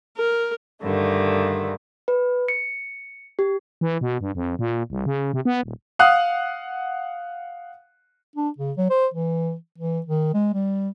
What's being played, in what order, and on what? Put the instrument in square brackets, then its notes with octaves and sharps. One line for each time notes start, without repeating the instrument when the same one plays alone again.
[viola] A#4
[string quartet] G2 D3 D#3 A3
[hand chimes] B4
C#7
G4
[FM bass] E3
B2
G2
F2
A#2
C2
C#3
C3
B3
D#1
[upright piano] F5 F#5 D#6 F#6
[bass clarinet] D4
C#3
F#3
C5
E3
E3
D#3
G#3
G3